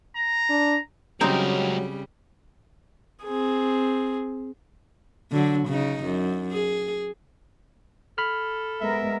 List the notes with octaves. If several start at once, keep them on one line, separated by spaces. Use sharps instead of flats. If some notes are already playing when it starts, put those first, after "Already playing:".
A#5
D4
C#2 C#3 F#3 G3 C4 D#4 A#4
C4 G#4
D3 F#3
C#3 D#4
F#2
G#4
A4 B5 F6
G#3 B3 A#4 E5